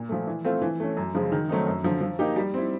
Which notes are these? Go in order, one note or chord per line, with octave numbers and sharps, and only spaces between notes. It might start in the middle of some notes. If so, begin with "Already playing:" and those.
Already playing: A#2
F3 A3
E3
A3 C4 F4 A4
E3
A3 C#4
F#2
C#3 F3 G#3
D#3
F#3 A3 C4 D#4
F#2
D3 F3
F3
A#3 D#4 G4
G3
C4 E4